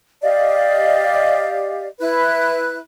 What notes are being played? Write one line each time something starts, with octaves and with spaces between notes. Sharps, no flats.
G4 D5 D#5 F5
E4 B4 F#6